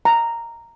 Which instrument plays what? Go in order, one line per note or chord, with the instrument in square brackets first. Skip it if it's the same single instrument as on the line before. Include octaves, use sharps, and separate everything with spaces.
[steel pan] A#5